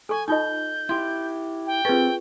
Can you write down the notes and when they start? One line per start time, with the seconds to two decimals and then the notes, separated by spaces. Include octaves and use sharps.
0.09 A4 G#5 C#6
0.28 D#4 F4 D#5 A5 D#6 G6
0.89 E4 G4 C6
1.66 G5
1.85 C4 F4 G#4 A4 B4 C#6